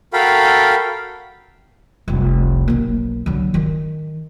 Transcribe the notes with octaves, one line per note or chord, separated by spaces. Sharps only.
F#4 A4 A#4 F5 G5 B5
F1 C2
B1 A#3
D3 F#3
D#3